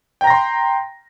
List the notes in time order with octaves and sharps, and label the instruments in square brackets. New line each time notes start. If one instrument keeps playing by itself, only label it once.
[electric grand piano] G5
A#5
A#6
C6